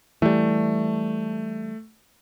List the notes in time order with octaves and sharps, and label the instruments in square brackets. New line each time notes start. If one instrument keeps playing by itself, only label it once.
[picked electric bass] E3 G3 [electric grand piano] A3